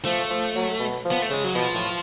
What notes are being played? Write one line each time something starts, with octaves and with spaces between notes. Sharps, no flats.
F3 A3
F3
F#3
B2
F3
B3
A3
C#3 G#3
F#3
B2 F3
A2